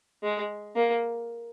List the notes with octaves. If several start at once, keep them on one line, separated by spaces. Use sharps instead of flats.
G#3
A#3